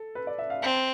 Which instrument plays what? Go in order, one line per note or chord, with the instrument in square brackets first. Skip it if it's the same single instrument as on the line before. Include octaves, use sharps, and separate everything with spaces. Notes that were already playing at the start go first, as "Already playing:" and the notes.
Already playing: [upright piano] A4
B4
D5
E5
F5
[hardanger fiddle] C4 [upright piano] A5